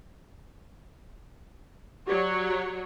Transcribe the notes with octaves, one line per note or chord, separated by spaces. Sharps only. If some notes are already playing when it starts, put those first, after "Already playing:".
F#3 F#4 G4 C#5 D5